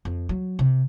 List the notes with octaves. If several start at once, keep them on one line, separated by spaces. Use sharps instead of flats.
F2
F#3
C3